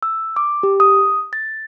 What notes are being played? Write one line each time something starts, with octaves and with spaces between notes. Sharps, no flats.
E6
D6
G4
D#6
A6